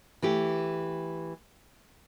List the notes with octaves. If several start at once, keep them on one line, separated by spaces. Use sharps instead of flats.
E3 A3 G4